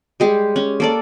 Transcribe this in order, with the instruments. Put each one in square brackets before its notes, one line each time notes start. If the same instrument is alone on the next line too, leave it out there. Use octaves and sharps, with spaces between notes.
[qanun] G3 G#3 G4 G#4
C#4
A#3 A4 D5